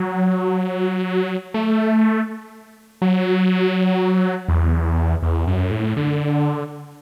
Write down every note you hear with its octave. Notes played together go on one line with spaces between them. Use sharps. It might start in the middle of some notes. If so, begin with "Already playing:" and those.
Already playing: F#3
A3
F#3
E2
E2
F#2
A2
D3